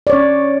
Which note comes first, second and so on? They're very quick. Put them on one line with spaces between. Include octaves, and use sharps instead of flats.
D5 C#5 C#4